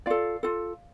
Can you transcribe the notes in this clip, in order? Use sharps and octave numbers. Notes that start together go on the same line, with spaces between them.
F4 A4 D5 F5
F4 A4